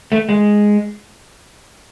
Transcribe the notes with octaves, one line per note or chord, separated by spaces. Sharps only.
A3
G#3